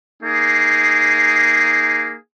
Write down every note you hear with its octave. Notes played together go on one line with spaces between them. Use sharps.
A#3 D#4 G#4